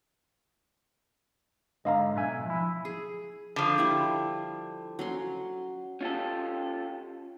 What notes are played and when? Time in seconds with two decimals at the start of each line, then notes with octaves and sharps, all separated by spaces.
1.85 G#2 D3 D#5 F5 A#5
2.16 B1 E5 G#5
2.46 F3 E4
2.85 G#4
3.56 D3 F3
3.78 G3 E4 E5
4.99 F#3 C#4 C6
6.01 C#4 F4 G4 A4